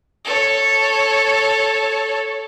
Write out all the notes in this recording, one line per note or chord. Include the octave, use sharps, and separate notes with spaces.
A4 C#5